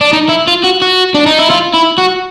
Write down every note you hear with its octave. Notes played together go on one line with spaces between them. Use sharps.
D4
D#4
E4
F4
F#4
F#4
D4
D#4
E4
F4
E4
F#4